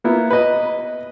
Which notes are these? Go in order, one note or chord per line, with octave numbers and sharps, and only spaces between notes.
A#3 B3 E4
B4 D#5